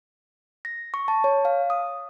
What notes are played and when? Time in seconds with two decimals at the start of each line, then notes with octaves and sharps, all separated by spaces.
0.65 A#6
0.94 C#6
1.08 A5
1.24 C#5
1.45 F5
1.70 D#6